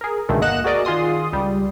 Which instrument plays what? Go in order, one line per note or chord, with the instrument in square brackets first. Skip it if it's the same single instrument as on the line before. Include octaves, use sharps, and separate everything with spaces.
[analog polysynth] G#4 A#4
C#2 B2 D3 D#3 G#3 A3
G1 A#3 D#5 F#5 F#6 E7
F#4 G#4 A#4 D5 D#5
D#3 F4 G#4 C6 D#6
C#2 G3